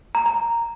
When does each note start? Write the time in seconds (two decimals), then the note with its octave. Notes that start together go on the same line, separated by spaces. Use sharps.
0.15 A#5
0.26 A#5